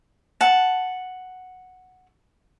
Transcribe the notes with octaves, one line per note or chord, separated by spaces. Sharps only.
F#5 A5